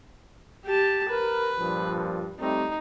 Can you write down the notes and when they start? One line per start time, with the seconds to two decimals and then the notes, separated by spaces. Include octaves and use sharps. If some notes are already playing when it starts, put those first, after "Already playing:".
0.65 G4 A5
1.09 A#4 B4
1.60 G2 A#2 F3
2.39 G3 A3 C4 D#4